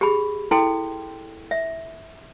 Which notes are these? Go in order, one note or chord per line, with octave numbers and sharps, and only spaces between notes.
G4 G#4 B5
E4 A4 G5 C6
E5